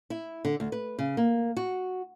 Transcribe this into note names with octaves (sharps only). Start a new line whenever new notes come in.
E4
D3
D2
B4
C#3
A#3
F#4